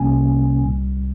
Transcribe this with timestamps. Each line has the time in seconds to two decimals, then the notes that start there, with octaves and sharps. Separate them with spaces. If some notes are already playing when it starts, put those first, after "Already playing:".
Already playing: C2 C3 G3 A#3 C#4 G#5
0.62 C2 A#2 G3